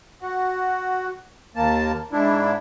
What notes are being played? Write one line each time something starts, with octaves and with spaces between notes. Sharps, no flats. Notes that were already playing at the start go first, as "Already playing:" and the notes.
F#4
D#2 A#3 A5
G#2 D4 E4